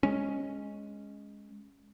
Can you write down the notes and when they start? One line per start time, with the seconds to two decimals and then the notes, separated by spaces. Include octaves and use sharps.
0.03 G#3 C#4